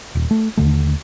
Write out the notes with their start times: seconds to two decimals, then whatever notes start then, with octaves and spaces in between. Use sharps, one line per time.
0.15 D#1
0.31 A3
0.57 D#2 D3 A3